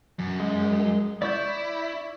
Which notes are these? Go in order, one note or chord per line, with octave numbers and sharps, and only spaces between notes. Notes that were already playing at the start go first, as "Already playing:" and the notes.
F#2
G#3
E4 D5 C#6 G6